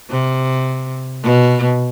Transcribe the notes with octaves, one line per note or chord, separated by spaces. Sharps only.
C3
B2